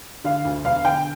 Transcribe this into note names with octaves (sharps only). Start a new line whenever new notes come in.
D3 F5
D2
E1 F5
D3 G5